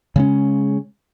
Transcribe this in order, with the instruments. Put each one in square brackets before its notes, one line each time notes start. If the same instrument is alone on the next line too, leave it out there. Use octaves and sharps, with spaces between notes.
[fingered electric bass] C#3 G#3 C#4